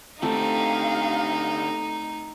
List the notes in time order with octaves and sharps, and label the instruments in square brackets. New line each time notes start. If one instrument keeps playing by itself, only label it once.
[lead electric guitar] D3 G4 [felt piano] A3 C4 A5 [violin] D#4 [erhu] F5